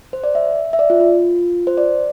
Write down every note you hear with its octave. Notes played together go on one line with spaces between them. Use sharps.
C5
D5
E5
E5
D5
F4
F4
C5
D5